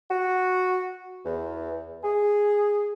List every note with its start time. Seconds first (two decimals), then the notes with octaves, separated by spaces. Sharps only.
0.10 F#4
1.25 E2
2.04 G#4